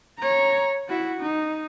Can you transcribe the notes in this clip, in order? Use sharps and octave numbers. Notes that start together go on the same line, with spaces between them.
C#5 A#5
E4 F#4
D#4